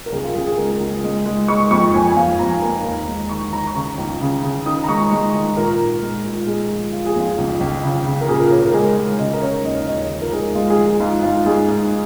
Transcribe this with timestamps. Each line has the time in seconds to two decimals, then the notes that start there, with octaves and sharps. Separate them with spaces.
0.06 A#4
0.12 C#2 G#4
0.24 F4
0.35 C#2 G#4
0.47 G#4
0.58 G#3 A#4
0.80 C#2
1.04 G#3
1.26 G#3
1.48 G#3 C#6
1.71 F2 C#6
1.94 F2 G#5
2.09 G#5
2.16 F2 F5
2.39 F2 A#5
2.62 A#3
2.85 D#2
3.08 G#3
3.29 D#3 C#6
3.53 D#3 A#5
3.67 C#6
3.75 C#3 A#5
3.98 C#2
4.21 C#3
4.43 C#3
4.66 D#3 D#6
4.84 A#5
4.88 G#3 C#6
5.11 G#3
5.34 D#3
5.56 A#2 A#4
5.79 A#2
6.02 G#3
6.25 A#2
6.47 G#3 G#4
6.69 F3
6.93 F3 F4
7.06 G#4
7.15 F2 F4
7.38 C#2
7.61 C#2
7.84 C#3
8.05 C#3
8.21 A#4
8.28 A#2 G#4
8.40 A#4
8.51 A#2 C#5
8.62 A#4
8.73 G#3 G#4
8.96 G#3
9.18 C#3 D#5
9.33 A#4
9.42 C#3 C#5
9.64 D#2 D#5
9.87 D#2 D#5
10.10 F3
10.22 A#4
10.32 G#2 G#4
10.55 G#3 F4
10.70 G#4
10.78 F3
10.86 G#4
11.00 G#2 F4
11.23 G#2 F4
11.45 G#2 G#4
11.68 G#2